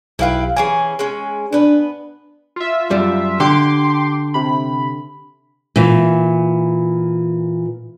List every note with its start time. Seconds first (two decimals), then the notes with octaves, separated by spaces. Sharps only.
0.19 B1 E4 G4 B4 F5
0.57 E3 C#4 G#4 G#5
0.99 G#3 C#4
1.53 B3 D4 B4
2.56 F4 E5
2.90 F#2 G3
3.40 D3 G4 C6 D6
4.34 C3 B5
5.76 A#2 E3